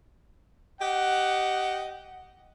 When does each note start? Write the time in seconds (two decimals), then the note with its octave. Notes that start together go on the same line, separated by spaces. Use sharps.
0.82 G4 D#5 F#5